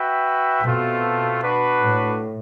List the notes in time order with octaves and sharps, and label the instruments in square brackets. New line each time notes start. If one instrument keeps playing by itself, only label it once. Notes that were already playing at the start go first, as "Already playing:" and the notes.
Already playing: [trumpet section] F#4 B4 E5 G5
[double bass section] B2 [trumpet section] A3 C4 F4 A4
[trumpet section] D4 F#4 B4
[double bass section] A2